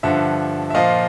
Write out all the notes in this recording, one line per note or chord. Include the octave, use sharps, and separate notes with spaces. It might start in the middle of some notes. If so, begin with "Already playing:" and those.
G2 D3 F3 E5 F#5
E5
A#2 F3 D#5 F5